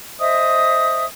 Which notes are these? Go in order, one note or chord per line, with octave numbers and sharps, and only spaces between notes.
C5 D#5 E5 D#6